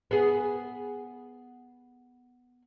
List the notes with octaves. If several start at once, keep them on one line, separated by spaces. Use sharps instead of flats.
B3 G#4